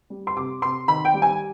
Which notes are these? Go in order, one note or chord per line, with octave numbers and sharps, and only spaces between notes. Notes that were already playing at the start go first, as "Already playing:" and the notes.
G3
C6
C3 D6
C3 C6
D#3 B5
G5
G3
G#5